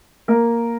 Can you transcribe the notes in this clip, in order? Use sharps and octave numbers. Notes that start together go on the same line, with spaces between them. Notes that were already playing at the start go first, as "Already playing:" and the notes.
A#3 A#4